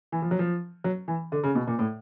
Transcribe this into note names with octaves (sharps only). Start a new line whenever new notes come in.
E3
F3
F#3
F3
F#3
E3
D3
C#3
B2
A#2
A2